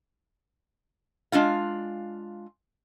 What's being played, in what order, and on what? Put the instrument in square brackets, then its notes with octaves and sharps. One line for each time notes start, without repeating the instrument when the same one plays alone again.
[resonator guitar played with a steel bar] G#3 D4 F4 F5